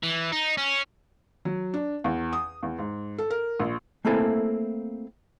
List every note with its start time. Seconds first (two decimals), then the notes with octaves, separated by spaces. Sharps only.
0.03 E3
0.32 D#4
0.57 C#4
1.45 F#3
1.74 D4
2.04 E2
2.33 D#6
2.63 E2
2.79 G#2
3.18 A4
3.30 A#4
3.60 A#1
4.05 A3 A#3 C4 E4 A4 G#5